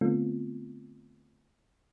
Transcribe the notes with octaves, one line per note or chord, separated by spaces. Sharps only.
D3 A3 B3 C4 F4